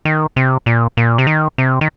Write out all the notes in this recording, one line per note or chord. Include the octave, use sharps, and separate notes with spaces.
D#3
C3
A#2
A#2
C3
D#3
C3
D#3